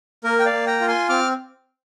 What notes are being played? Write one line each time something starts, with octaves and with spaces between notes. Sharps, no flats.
A#3 A#4
G5
D5 F5
A#3
G5 A#5
F4
G#5 C6
C4 D6 F6